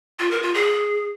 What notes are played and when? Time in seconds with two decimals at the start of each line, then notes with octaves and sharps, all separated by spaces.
0.19 F4
0.31 A#4
0.43 F4
0.54 G#4